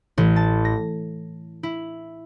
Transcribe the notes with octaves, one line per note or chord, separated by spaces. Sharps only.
A1
A5
A#6
E4